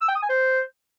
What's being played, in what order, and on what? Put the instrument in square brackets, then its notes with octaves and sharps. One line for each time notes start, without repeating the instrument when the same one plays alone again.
[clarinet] E6
G5
D#6
G#5
C5